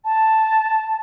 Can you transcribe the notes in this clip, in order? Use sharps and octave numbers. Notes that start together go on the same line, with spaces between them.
A5